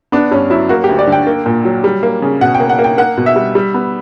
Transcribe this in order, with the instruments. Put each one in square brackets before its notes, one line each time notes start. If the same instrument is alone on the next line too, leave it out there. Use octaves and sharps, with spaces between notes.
[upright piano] B3 D4
G2 C#4
F#3 E4
A#3 F#4
G4
D2
D5
D3
G5
A#3
A#2
F#3
G3
A#3
C#3
B2 F#5
G5
A#3
F#5
A#3
G5
A#3 F#5
B2
E5
G3
G3
B3